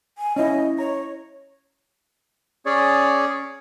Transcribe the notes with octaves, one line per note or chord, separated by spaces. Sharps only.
G#5
C#4 E4 D#5
C#5 A#5
C#4 G#4 C#5 D5